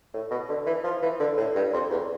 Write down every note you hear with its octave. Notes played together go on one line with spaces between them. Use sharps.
A2
B2
D3
E3
F3
E3
D3
A2
G2
F2
E2